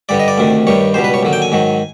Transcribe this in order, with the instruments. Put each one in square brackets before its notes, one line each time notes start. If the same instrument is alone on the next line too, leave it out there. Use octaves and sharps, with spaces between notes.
[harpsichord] G2 D3 G3 D5
D#5
D5
D2 C3 D#3
G2 D#3 G3 C#5
C#2 B2 G3 C5
B4
C#5
D#2 D3 F#3
G5
G#5
G#2 D#3 F#3